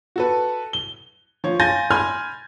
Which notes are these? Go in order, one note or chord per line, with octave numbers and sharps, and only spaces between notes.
F#4 A4 B4
G7
F3 C#5
F5 G#5 C6 G6 A6 A#6
G#5 B5 C6 F6 G#6